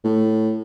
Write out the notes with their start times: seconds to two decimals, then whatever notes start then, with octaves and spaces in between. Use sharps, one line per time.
0.04 A2